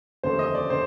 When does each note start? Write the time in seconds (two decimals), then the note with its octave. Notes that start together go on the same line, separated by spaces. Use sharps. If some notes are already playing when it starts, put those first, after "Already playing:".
0.24 F1 D#2 D3 A3 C5
0.39 D#5
0.55 D5
0.70 D3 C5